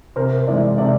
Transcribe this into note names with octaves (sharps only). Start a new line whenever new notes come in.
C3 A#4 C5
E3 G#3 D5 E5
C3 D5 E5